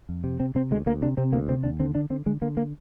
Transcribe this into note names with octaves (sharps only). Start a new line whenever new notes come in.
F2
C3
C3 C4
C3 C4
D2 G#3
D2 A#3
C3 D4
C3 C4
D2 A#3
C3 C4
D#2 D4
D3 C4
D3 D4
D3 C4
D3 G#3
D3 A#3
A#3